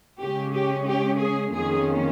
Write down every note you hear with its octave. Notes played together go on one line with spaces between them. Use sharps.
C#3 G#3 C#4 G4
G4
G4
G#4
F2 D#3 A#3 C#4 G#4